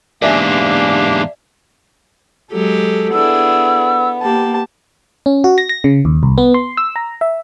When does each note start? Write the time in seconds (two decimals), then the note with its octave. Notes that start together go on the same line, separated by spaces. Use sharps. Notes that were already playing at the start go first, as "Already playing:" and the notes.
0.22 E2 G#2 A#3 D4 G4 D5 E5 G#5
2.52 F#3 G#3 G4 A4
3.13 B3 D4 E4 G#4 E6
4.22 A#3 G4 A5
5.26 C#4
5.44 F#4
5.58 A#6
5.69 A#6
5.84 C#3
6.05 D#2
6.23 C2
6.38 B3
6.54 C6
6.77 E6
6.96 A#5
7.21 E5